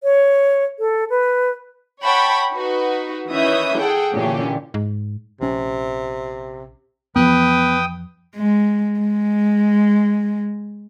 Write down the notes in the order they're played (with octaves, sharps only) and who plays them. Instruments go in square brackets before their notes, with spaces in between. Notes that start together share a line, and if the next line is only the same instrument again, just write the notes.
[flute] C#5
A4
B4
[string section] C#5 F#5 G5 A5 B5 C#6
D#4 F#4 B4
D#3 E3 C#4 E5 D#6 G6
G#4 A4 F#5 G5
A#2 D3 E3 C#4 G4
[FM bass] G#2
[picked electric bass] A#1 C#4 [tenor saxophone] C3
[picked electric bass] F2 E3 F3 [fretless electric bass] B3 [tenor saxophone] B4 [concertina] G5 D#6
[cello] G#3
G#3